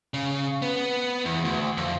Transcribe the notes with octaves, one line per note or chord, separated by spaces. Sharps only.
C#3
B3
E2
D2
F2